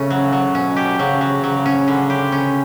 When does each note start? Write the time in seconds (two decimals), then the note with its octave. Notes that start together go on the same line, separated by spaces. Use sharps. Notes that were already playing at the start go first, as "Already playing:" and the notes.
Already playing: C#3 A3 C#4
0.10 F#3
0.33 F#3
0.55 B2 C#4
0.76 G4
0.99 C#3 F#3
1.21 F#3
1.44 C#3 F#3
1.66 C#4
1.88 D3
2.10 G4
2.32 C#4